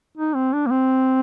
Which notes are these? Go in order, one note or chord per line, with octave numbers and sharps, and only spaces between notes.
D#4
C4
D4
A#3
C4